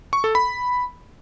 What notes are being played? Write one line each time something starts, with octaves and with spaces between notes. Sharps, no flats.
C#6
A4
B5